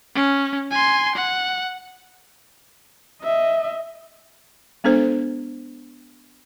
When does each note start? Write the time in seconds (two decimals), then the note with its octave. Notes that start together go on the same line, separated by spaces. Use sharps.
0.15 C#4
0.71 G#5 C6
1.16 F#5
3.23 D#5 E5
4.84 G#3 B3 D4 A4 C5